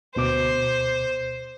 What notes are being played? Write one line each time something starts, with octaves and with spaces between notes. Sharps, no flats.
D2 B2 C5 D6